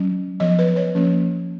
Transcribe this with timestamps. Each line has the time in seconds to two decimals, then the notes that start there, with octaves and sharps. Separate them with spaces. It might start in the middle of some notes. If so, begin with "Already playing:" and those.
Already playing: F#3 C#4
0.40 F3 B3 D#5
0.59 B4
0.76 C#5
0.95 F3 A#3 C#4